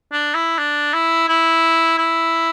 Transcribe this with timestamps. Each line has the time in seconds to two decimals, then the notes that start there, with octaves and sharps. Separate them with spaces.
0.12 D4
0.35 E4
0.58 D4
0.93 E4
1.28 E4
1.98 E4